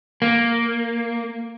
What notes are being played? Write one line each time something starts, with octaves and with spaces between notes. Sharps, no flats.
A#3